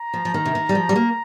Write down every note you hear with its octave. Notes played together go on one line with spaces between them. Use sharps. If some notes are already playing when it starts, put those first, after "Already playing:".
Already playing: A#5
F3
F3
D#3
C3
D#3
G3
F3
G3
A#3